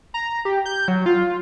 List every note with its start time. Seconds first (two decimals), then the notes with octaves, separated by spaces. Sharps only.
0.14 A#5
0.45 G4
0.65 G6
0.88 F#3
1.06 F4